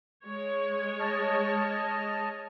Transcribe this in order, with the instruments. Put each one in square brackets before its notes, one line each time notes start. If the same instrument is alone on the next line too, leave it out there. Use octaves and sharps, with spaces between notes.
[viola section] G#3 C#5
[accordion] D#5 A5 F6